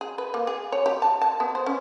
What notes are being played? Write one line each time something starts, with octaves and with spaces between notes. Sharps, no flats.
G#4
B4
A#3
G#4
C#5
G4
A5
A5
B3
C5
C#4